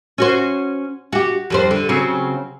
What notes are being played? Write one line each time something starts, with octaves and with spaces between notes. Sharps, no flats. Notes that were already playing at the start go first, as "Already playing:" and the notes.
C#4 F#4 C5
F#4 G4
F2 G3 C5
D3
C#3 F#3 C4